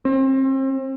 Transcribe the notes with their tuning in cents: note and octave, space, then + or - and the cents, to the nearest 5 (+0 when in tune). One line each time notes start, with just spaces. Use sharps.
C4 +35